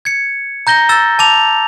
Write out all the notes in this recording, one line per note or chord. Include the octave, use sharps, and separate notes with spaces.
G#6 C#7
A#5 G6 A#6 G7
A#5 E6 A6 G7
A5 D6 F7